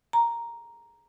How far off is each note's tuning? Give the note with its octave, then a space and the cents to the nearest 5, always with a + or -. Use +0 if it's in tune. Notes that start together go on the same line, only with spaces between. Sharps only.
A#5 +0